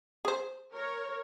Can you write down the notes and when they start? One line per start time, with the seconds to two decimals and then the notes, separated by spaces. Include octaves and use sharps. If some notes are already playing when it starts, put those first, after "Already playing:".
0.25 G#4 C5
0.73 A#4 C#5